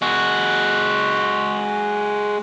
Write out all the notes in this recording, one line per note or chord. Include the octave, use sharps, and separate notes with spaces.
G#3 F#4